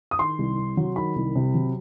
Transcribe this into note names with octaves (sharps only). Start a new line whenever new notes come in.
D#6
D#3 C6
C2
C3
F#3
D#3 B5
C2
C3
F#3